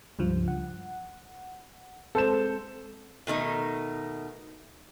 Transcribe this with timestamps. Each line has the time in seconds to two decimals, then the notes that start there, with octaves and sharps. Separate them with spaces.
0.19 C#2 G2 F3
0.48 F#5
2.15 G#3 C4 A4 C5 E7
3.27 B2 D#3 A3 D#4